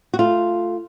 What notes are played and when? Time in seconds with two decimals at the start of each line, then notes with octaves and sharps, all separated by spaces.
0.14 F#4
0.19 A3 F4